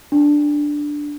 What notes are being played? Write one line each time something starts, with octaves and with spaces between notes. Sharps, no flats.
D4